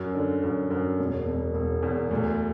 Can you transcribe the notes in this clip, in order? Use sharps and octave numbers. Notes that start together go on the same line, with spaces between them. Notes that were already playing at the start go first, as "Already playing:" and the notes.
Already playing: F#2
D3
F#2
F#2
E1
E1
E1
E2
D2